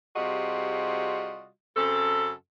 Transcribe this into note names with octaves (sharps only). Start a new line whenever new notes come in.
C3 G3 F4 F#4 G#4 D#5
F#2 C#3 C4 A4